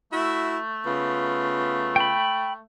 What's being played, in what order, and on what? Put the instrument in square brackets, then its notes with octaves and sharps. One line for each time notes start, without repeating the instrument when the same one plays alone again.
[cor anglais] A3 [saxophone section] E4 F#4 E5
[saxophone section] C#3 B3 F4
[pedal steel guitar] G5 B5